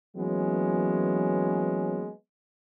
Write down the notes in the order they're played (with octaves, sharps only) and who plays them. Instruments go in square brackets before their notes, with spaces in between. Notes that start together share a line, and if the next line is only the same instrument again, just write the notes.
[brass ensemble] E3 F#3 G#3 A#3 B3 C#4